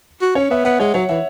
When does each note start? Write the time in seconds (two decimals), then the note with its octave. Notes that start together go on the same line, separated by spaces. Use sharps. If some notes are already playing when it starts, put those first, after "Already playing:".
0.21 F#4
0.35 C#4 C#5
0.50 B3 E5
0.65 B3 F#5
0.80 G#3 C#5
0.94 F#3 C#5
1.09 E3 E5